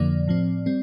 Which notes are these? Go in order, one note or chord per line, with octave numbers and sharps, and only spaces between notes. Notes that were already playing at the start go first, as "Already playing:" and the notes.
Already playing: F2 D3 F3 A#3 D5
A2 F3 C4
G3 C4